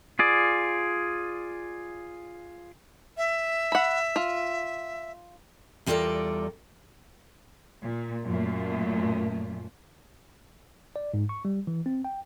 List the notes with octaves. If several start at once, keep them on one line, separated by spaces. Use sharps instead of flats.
F4 G#4 D5
E5
F#5 B5
F4
E2 G3 F4 A4 A#4 D5
A#2
F#2 A#2 A3
D5
G#2
C#6
G3
E3
C4
G5